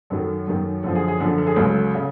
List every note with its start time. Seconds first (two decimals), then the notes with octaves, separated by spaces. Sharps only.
0.10 F#2 D#3 F#3 A4
0.47 F#2 D#3 F#3
0.83 F#2 D3 F3 A4
0.95 G#4
1.08 G#4
1.20 F#2 D3 F3 A4
1.38 A4
1.47 G#4
1.56 C#2 C#3 F#3 A4
1.95 C#3